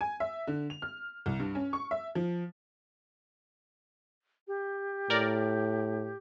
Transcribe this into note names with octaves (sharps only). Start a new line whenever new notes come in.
G#5
E5
D3
F7
F6
C2
G2
C#4
C#6
E5
F3
G4
A2 A#4 D5